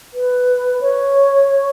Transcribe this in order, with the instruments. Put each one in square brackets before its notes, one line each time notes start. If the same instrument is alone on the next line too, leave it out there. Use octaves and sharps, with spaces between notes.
[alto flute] B4
C#5